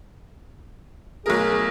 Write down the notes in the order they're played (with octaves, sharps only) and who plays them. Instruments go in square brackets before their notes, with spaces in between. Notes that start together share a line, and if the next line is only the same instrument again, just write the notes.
[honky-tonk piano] B1 A3 A#4 [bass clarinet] G#4